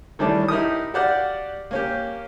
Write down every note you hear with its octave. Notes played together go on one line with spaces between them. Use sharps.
D#3 E3 G3 A3 C#4 D4
D#4 E4 G4 A#4 D#6
F#4 G4 D5 F5 F#5
A#3 C#4 G4